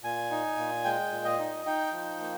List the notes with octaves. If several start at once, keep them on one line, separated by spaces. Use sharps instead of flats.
A#2 G#5
D#4
A#2
G#3 G5
A#2
D#5
D#4
D#4 G5
F3
A#3